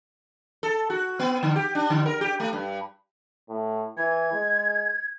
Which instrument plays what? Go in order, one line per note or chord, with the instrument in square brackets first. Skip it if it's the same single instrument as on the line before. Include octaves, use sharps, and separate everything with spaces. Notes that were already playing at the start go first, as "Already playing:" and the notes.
[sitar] A4
F#4
B3
D3
G4
D4
D3
A#4
G4
A3
G2
[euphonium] A2
[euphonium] E3 [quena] G#6
[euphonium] G#3